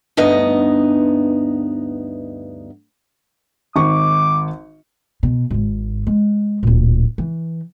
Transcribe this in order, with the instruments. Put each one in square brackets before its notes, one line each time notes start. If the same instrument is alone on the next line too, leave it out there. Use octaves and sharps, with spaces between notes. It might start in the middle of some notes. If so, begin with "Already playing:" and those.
[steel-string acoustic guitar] D2 G2 B3 D#4 D#5
[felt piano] G#1 C#6 [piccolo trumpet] D6
[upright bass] B2
G#1 G#2
G#3
D1 A#2
E3